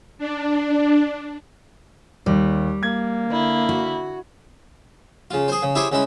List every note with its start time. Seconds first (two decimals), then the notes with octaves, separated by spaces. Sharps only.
0.18 D4
2.26 D#2 G3
2.83 A#3 G#6
3.26 D3 E4
3.69 F#4
5.31 C#3 F4
5.48 G#4 C5
5.62 C#3
5.75 E4 G4 G#4 C5 C#5
5.92 C#3 G#3 E4